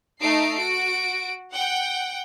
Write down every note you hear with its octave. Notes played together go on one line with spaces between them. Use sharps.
A3 D#4 C7 D7
F#4 D7
F#5 G5